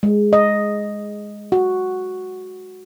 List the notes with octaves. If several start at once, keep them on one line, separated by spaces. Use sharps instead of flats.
G#3
D#5
F#4